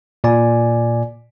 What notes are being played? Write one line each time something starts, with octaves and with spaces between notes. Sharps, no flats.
A#2 D5 G#5